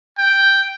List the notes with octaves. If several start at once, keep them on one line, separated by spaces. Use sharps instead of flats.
G5